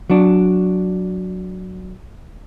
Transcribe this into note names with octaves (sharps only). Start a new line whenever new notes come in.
F#3 D4